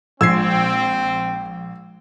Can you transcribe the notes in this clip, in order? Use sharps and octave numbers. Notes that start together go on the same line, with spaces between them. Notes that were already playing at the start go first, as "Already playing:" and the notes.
A#1 F3 G#3 C4 E6 G#6 C7